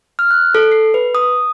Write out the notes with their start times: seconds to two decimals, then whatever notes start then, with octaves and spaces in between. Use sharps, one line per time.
0.19 F6
0.31 F#6
0.55 A4
0.72 C7
0.94 B4
1.15 D#6